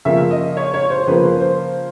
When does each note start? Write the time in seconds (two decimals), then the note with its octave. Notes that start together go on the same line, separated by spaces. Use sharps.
0.05 C#3 F3 A#3 E5
0.31 D#5
0.57 C#5
0.74 C#5
0.90 C5
1.07 C#3 F3 A#3 B4
1.25 C5
1.40 C5